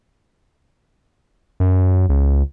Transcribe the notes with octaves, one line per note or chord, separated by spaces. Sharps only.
F#2
C#2